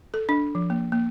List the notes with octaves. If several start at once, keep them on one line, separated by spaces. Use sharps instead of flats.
A4
D4
F3
A#3
A#3